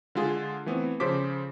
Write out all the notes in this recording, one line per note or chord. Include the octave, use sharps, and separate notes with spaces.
D3 G#3 F4 G#4
E3 A3 B3 C4
C#3 F3 A4 C5 D6 B6